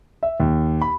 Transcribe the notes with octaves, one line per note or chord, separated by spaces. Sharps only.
E5
D#2
B5